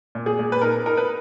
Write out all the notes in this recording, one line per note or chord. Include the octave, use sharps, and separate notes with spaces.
A#2
G#4
A#2
B4
D#4 A#4
D#4 A#4
B4